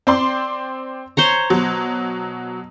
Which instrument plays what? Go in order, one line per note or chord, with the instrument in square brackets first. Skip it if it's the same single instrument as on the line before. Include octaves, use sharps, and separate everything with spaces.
[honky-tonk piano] C4 D5 C6
[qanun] C5 C#5 A#5
[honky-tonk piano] B2 F#3